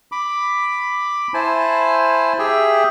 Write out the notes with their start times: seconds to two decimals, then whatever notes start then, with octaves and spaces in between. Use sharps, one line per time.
0.12 B5 D6
1.34 E4 C5 G#5 A5
2.39 G4 G#4 E5 G5